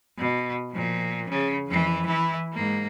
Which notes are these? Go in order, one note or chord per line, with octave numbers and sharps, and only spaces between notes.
B2
A#2 F3
C#3
F2 E3
E3 E4
G#2 A#3